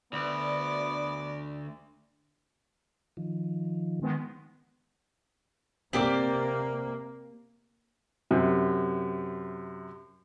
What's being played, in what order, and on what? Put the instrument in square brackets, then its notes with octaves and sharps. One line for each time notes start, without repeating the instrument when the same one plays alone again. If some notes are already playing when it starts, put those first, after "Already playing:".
[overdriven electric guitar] D2 [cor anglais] B3 [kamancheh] D5
[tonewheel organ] D#3 F3
[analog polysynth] D#3 G#3 B3
[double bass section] C3 A#3 [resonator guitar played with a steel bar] C4 G4 D5
[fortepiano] F#2 C3